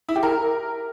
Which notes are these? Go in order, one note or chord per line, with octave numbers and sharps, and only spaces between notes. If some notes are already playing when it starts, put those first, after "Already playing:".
E4
G4
A#4